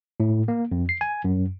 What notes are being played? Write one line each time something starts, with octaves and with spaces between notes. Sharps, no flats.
A2
A#3
F2
C7
G#5
F#2